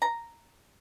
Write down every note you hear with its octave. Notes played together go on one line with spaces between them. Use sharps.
A#5